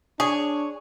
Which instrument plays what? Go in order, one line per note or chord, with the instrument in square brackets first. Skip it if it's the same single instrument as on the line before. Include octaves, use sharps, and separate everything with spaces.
[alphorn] D4 [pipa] G#4 [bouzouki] C#5